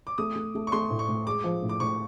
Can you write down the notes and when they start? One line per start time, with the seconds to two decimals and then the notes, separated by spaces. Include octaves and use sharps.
0.07 D6
0.18 A3 D#6
0.36 A3
0.55 A3
0.67 C#6
0.72 A3 C6
0.90 A2
0.99 C#6
1.09 A2
1.27 G#3 D6
1.44 F3
1.63 A2
1.69 D6
1.80 A2 C#6